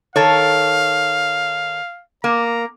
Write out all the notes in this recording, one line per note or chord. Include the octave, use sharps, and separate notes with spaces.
D#3 A4 C#5 F5
A#3 A#5